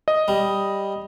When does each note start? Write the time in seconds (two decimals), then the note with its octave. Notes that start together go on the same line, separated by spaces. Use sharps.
0.08 D#5
0.28 G3